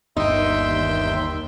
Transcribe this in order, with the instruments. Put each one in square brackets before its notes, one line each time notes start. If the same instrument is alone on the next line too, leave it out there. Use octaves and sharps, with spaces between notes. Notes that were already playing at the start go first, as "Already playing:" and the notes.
[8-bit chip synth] G1 G5 [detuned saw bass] D#2 [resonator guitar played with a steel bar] D#4 [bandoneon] E5 C6